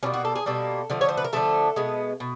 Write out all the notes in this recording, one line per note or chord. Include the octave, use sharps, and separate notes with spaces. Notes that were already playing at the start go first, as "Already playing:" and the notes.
B2 G3 A#3 C#4
F#4
A4
G#4
B2 G3 A#3 A4
D3 F3 A3
C#5
C5
B4
A#4
D3 F3 A3 A4
B2 G#3 B3
B2